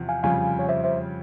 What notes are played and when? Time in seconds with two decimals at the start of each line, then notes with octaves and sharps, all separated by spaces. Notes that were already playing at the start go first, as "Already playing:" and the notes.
Already playing: E2 C3 F3
0.09 F5 G#5
0.23 F2 C#3 G3 C#4 F4 F5 G#5
0.59 C#5
0.69 C5 E5
0.84 C5 E5